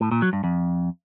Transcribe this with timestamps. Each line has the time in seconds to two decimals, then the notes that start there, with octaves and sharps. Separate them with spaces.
0.01 A2
0.11 A#2
0.22 F#3
0.33 G2
0.44 F2